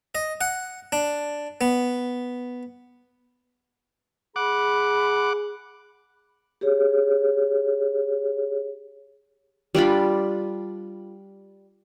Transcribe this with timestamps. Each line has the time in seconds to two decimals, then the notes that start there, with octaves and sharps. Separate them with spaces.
0.15 D#5
0.41 F#5
0.92 D4
1.61 B3
4.36 G#4 F#5 B5 D6
6.61 G4 G#4 C#5
9.75 G3 D4 F4 B5